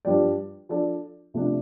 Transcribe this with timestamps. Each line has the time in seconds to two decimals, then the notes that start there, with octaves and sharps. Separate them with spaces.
0.05 G2 F3 D4 G4 D5
0.69 F3 D4 A4 D5
1.34 C3 F3 A3 D4